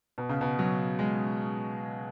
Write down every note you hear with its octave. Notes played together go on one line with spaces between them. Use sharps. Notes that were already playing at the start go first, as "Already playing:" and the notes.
B2
C#3
B2
F#3
G#3